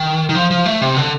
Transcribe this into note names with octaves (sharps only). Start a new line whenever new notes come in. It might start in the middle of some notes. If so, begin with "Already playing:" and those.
Already playing: D#3
D#3
F3
F3
A3
C3
D3